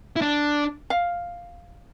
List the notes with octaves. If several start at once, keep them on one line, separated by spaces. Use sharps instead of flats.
E4
D4
F5